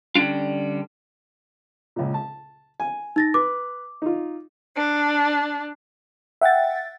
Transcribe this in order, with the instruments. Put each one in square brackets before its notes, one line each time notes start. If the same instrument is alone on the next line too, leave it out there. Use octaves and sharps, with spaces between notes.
[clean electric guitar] D3 G3 C#4 D4 F4
[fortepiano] C#2 A#2
A5
G#5
[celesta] D#4 A6 A#6
[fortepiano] B4 [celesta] D6
[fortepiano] D#4 F4
[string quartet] D4
[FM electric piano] E5 F#5 G5 A6